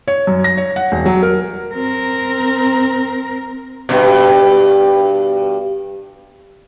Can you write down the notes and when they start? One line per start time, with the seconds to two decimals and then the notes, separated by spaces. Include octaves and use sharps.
0.08 C#5
0.27 F#2
0.44 A#6
0.57 C#5
0.76 F#5
0.92 E1
1.06 F#3
1.22 A#4
1.74 C4 A#4
3.89 G2 B2